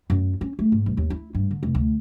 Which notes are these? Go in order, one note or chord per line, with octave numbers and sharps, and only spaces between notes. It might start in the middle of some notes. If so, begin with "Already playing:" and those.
F#2
C#4
A3
G#2
B1
D#2
E4
G2
D3
F1
D2